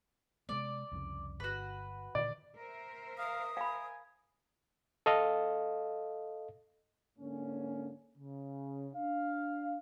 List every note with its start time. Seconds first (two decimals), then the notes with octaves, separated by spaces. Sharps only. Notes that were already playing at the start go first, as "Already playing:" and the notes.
0.49 C3 G#3 B3 D5
0.92 C2 F2 C#3
1.40 G1 F#4 B4
2.15 A#2 D3 D#3 D5
2.56 A#4 C5 E5
3.18 F5 D#6
3.57 F5 G#5 B5
5.06 A4 D#5 F5
7.18 G#2 D3 A#3 C#4
8.17 C#3
8.94 D4 F5